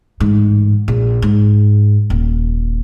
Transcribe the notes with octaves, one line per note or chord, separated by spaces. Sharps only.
A1 G#2
A#1
G#2
D#1